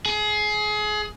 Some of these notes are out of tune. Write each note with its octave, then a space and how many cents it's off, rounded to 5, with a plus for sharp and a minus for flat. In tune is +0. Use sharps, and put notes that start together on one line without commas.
G#4 +25